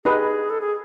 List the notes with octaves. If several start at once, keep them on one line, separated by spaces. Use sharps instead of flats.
D#4 G4 G#4 B4 D#5
A4
G#4